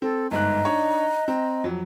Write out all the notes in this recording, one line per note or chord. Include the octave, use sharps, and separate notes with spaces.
C4 A4
G1 G#2 D#5 A#5 F#6
D4 D#4 C#5
C4 A#5
F2 F#3